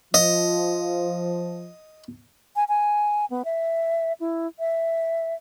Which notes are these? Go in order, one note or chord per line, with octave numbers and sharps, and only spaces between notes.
F3 D#5
G#5
G#5
B3
E5
E4
E5